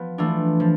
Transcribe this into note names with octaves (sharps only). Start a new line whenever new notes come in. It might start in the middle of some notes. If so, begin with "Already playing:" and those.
Already playing: F3 B3
E3 A3 D4 F4
F3